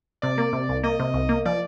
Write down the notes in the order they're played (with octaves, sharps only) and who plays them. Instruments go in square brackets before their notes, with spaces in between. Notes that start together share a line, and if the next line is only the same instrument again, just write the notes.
[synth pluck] C3 [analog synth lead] D5
[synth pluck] A#3
C3
C2
[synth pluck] A#3 [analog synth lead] D#5
[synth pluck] C3
C2
A#3
[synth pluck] F3 [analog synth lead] D5